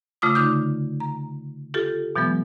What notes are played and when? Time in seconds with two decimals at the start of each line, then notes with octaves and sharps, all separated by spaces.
0.22 C#3 A3 F4 D6 D#6
0.35 D3 D#4 D6 D#6 G6
1.00 A#5
1.74 F4 G4 A4
2.16 B2 E3 F#3 G#3 B3